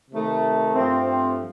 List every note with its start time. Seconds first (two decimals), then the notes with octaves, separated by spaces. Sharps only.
0.11 C3 D#3 A3
0.75 G2 F3 A3 C4
1.07 C4